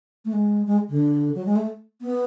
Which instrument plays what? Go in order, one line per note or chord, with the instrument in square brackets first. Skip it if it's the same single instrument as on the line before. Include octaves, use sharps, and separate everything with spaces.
[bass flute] A3
G#3
G#3
D3
F#3
G#3
A3
B3